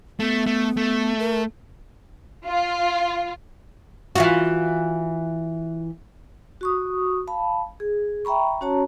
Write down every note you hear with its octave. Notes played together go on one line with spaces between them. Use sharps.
A3 B3
A3
A3
A#4
F4
E3 F4 F#4
F#4 C#6 D#6
F5 A5 B5
G#4
E5 G5 A#5 B5 C#6
C#4 F#4 C#5 A5 A#5